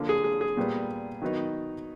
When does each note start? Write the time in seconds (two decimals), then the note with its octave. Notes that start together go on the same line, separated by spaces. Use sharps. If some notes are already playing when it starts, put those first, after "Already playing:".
Already playing: D3 F3 A#3
0.09 G#4
0.24 G#4
0.41 G#4
0.57 A#2 G3 B3
1.22 D#3 F#3 B3 D#4